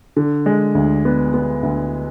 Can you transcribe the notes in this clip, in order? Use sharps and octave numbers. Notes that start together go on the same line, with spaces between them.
D3
G#3
D2
B3
B3
D2